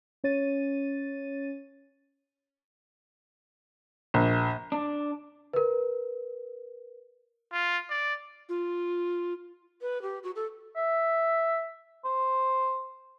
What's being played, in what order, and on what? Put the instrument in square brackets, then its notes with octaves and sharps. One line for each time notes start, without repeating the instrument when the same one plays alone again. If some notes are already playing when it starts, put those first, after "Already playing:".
[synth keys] C#4 C#5 A6 D#7
[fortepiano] A#1
[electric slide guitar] D4
[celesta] A#4 B4
[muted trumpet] F4
D5
[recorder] F4
[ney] B4
G4
F#4
A4
[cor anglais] E5
C5